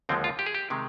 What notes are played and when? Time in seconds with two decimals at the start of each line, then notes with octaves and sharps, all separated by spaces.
0.09 D#2 D3 F3 G#3 C4
0.24 F4
0.39 G4
0.46 G#4
0.55 G4
0.70 C3 D#3 G#3